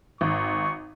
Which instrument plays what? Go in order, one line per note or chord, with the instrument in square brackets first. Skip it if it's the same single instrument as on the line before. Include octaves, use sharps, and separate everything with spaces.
[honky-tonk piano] G#1 [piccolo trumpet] C#6